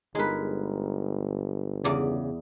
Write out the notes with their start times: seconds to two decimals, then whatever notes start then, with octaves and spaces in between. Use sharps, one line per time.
0.15 G1 G#3 D#4 A#4 B4
1.84 E2 C#3 D5